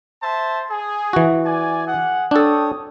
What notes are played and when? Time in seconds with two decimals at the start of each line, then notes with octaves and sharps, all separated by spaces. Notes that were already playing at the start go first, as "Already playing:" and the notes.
0.22 C5 E5 A5
0.70 G#4
1.13 E3 F#4
1.45 D5 G#5
1.86 G#4 F#5
2.31 D4 A4 C#5 G5 D#6